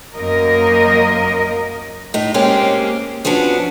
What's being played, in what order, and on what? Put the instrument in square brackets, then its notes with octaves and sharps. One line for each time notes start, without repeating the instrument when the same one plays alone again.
[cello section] F#2 A#3 A#4 D#5
[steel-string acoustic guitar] A2 D#4
G#3 A#3 C4 C#4 G4
F3 B3 C#4 D4 F#4